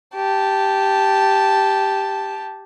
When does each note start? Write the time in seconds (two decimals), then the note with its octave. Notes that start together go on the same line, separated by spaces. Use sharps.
0.15 G4 A5